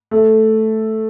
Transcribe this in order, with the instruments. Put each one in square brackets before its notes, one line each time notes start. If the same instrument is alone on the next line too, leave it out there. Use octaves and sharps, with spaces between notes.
[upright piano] A3